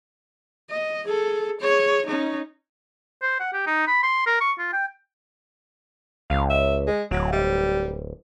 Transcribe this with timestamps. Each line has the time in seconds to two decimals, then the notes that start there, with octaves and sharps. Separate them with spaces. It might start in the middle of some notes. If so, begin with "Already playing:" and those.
0.70 D#5
1.04 G#4 A4
1.60 G#4 C#5
2.06 C#4 D#4
3.22 C5
3.40 F#5
3.53 G4
3.67 D#4
3.88 B5
4.03 C6
4.26 A#4
4.41 C#6
4.59 F4
4.73 G5
6.30 C#2 F5
6.50 E5
6.87 G#3
7.11 D1 F#3
7.32 G3